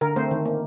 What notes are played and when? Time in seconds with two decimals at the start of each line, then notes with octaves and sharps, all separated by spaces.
0.01 D3 A#4
0.16 A3 C4 C5
0.31 D#3
0.46 A#3